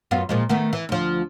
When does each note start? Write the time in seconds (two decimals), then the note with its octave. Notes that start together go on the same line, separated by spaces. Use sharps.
0.11 F#2 B3 F4
0.29 A#2 F3 G#3
0.49 D#3 A3 B3
0.73 E3
0.89 D2 F3